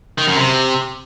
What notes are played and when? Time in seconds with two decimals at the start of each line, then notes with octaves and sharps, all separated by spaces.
0.18 D#3
0.27 F#2
0.37 C3